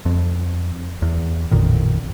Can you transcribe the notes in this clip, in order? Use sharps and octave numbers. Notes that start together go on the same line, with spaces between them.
F2
E2
A1 F2 A#2 D#3